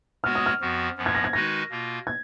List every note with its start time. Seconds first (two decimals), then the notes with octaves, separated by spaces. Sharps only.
0.24 G#3 B3 F#4 C#5 F6
0.35 D#6
0.46 F6
0.61 F2 F3 B3 F#4
0.96 F#2 F3 B3
1.06 G#6
1.15 A#6
1.24 G#6
1.33 D#3 G#3 D#4 F#4 B4 A#6
1.70 B2 A#3 F4
2.07 G#6